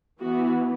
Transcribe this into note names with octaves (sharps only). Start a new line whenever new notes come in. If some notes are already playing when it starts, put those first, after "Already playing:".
E3 B3 F#4